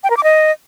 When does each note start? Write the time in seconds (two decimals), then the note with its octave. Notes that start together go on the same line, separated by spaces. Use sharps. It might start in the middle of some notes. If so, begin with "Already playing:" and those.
0.04 G5
0.10 A#4
0.17 D6
0.24 D#5